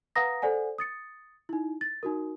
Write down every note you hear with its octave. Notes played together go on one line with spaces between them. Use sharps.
B4 F5 F#5 A#5 D#6 A#6
A4 C5 D5 F#5 G#5
D#6 A6 C#7
D#4 E4
A6
D#4 F#4 A#4